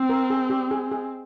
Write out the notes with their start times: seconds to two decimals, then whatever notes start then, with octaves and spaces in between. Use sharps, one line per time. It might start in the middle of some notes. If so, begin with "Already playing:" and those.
Already playing: C4
0.09 A#4
0.30 G#4
0.50 G4
0.71 G#4
0.92 G#4